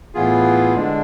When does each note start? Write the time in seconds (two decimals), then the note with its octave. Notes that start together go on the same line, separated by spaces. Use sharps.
0.14 A2 E3 B3 F4 G#4
0.74 D3 G#3 D4